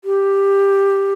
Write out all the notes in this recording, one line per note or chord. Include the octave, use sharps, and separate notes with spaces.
G4